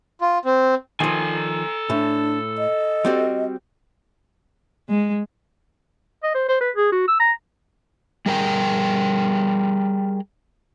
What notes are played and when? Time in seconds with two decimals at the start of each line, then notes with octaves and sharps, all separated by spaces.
0.21 F4
0.45 C4
1.00 D#3 F3 A4 G#5
1.90 A2 D4
2.58 D#5
3.05 G3 C4 F#4
4.89 G#3
6.23 D#5
6.34 C5
6.48 C5
6.61 B4
6.76 G#4
6.92 F#4
7.08 E6
7.20 A#5
8.26 G3 G#4 A#4 G5